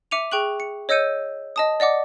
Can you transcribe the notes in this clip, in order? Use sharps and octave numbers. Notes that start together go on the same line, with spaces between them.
E5 D6 C#7 D#7 F7
G#4 G5 C#6 F#6 F#7
C#7
C#5 D#5 E6 G6 C#7 D#7
D#5 A5 D#6
D5 D#5 F#5 D6